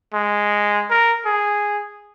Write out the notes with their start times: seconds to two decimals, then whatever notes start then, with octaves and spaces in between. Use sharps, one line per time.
0.14 G#3
0.90 A#4
1.26 G#4